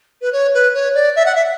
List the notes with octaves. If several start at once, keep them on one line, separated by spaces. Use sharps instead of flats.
B4
C#5
B4
C#5
D5
E5
F#5
E5